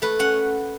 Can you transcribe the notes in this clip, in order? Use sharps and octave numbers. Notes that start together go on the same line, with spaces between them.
A3 B4
C#4 F#5